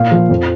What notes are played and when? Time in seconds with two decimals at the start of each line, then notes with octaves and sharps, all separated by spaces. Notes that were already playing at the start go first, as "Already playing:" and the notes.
Already playing: A#2 F5
0.11 F3
0.29 F2